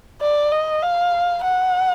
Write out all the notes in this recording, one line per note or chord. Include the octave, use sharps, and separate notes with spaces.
D5
D#5
F5
F#5